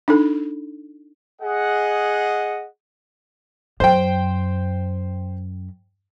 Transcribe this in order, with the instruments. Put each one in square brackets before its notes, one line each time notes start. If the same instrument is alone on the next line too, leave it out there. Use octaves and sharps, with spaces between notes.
[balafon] D4 D#4 A4
[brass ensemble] G#4 D#5 F#5
[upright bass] F#2 [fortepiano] C5 G5